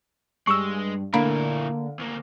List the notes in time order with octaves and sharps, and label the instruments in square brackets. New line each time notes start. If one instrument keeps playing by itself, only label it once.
[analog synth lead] G2 [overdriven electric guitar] G#3 [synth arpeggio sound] C#6 E6
[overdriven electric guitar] A#2 E4 [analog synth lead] D3 [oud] A#3 [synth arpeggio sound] B5
[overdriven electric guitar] D2 A#3